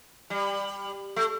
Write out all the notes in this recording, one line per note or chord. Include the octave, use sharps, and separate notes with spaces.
G3
A3